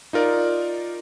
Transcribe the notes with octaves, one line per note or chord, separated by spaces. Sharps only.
D#4 F4 A#4 D5